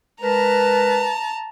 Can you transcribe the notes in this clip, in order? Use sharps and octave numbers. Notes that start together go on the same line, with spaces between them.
G#3 A#4 B4 A5 A#5